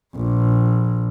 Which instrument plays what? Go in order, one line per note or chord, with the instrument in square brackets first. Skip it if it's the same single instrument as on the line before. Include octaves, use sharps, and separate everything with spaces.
[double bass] A#1